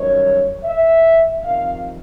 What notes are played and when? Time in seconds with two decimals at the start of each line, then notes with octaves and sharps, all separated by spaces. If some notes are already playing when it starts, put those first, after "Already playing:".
Already playing: F#2 D#3 G3 C#5
0.64 E5
1.41 F2 C3 D#3 F5